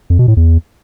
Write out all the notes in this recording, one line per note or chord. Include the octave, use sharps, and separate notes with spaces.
F2
B2
A2
E2